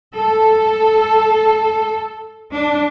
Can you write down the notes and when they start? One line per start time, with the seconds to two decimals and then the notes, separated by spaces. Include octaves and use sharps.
0.14 A4
2.54 D4